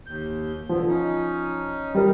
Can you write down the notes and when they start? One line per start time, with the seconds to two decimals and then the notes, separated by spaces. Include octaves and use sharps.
0.06 D#2 G6
0.69 D3 F3 B3
0.87 C#4 D#4
1.95 G3 D#4 A#4